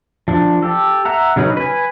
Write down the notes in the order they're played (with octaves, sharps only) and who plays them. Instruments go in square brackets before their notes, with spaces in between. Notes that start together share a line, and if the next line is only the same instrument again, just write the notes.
[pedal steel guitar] F3 D4
G4 A4
E5 F#5 A#5
C#3 F#3 C#4 D#4 B4
B4 G#5